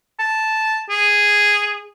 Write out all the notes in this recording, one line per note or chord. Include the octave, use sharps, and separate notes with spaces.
A5
G#4